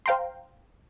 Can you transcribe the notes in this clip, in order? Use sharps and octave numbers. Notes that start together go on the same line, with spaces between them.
C5 F5 G5 A#5 C6